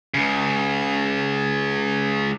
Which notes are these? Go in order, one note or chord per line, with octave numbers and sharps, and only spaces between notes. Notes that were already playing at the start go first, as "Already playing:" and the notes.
C#2 C#3